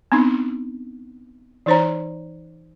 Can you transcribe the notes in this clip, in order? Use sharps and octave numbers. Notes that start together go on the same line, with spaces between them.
B3 C4 D4 D#4
E3 D#4 C5 C#5 A#5